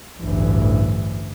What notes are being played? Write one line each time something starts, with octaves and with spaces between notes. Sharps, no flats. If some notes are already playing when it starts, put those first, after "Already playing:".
A1 D2 G2 E3